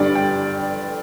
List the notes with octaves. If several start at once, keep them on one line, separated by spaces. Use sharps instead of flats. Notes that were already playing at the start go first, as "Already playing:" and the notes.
Already playing: G1 G2 D3 G3 D5
G5